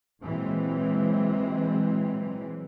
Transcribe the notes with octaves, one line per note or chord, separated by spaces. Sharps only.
A#2 E3 F#3 G#3 C4